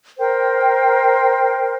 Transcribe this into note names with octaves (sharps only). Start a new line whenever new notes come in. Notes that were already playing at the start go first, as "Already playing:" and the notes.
A#4 C5 G5